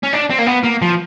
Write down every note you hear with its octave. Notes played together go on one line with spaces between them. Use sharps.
C#4
D4
C4
A#3
B3
A#3
F3